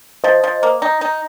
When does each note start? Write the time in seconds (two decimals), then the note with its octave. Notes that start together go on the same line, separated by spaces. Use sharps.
0.24 F3 C5 D#5
0.44 F3
0.63 A#3
0.82 D#4
1.01 D#4